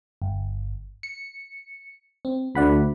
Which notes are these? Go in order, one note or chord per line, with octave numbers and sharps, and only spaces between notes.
G1
C#7
C4
D2 D5 F#5 B5